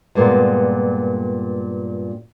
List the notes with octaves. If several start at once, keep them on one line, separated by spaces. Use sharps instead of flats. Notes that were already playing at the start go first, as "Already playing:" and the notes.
G2 A#2 G#3 B3 A#4